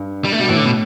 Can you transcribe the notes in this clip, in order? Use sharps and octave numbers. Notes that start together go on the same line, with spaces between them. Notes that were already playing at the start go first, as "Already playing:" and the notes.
Already playing: G2
G3
A3
B2 G3
A2 E3
D3
B2